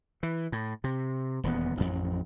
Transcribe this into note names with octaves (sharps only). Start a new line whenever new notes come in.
E3
A2
C3
D#1 E2 B3
A1 F2